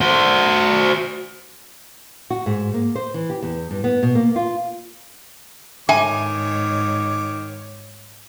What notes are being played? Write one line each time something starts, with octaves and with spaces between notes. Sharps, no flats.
F#4 C5
F#4
G#2
A#3
C5
E3
G4
E2
G2
B3
B2
A#3
F4
G#2 D#3 C#5 E5 G#5 D6